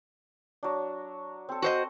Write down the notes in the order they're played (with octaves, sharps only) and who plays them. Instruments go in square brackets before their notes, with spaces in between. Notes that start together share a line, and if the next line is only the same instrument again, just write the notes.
[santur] F#3 D4
C4 A4
[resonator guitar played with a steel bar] F#4 C5 D#5